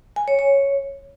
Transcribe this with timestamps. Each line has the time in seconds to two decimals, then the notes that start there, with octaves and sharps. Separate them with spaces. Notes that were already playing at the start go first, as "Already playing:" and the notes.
0.16 G#5
0.28 C#5
0.39 C#5